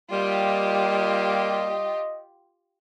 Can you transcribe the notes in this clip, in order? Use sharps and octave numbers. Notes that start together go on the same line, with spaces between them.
G3 A#3 F4 G4 D#5